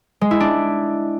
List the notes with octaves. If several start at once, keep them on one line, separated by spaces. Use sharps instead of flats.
G#3
E4
D4